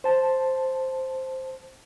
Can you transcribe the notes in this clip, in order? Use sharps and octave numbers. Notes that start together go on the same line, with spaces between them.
C5 A5